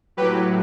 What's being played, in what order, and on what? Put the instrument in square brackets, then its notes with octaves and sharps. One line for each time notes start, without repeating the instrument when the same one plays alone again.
[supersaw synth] A2 F#3 G4 B4